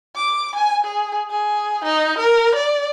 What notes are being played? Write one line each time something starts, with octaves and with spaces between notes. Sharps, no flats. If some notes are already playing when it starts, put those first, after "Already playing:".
D6
G#5
G#4
G#4
D#4
A#4
D5